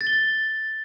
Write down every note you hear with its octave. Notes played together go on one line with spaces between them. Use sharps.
A6
G7
A6